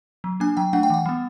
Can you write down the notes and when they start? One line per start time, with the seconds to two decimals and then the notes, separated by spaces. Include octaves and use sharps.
0.24 F#3
0.40 A#3 D4 G#5
0.57 F#3 G5
0.73 A3 D4 F#5
0.83 G5
0.90 E3 F#5
1.06 G3 B3